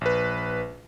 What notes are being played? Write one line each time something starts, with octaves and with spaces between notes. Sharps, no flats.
A#1 B4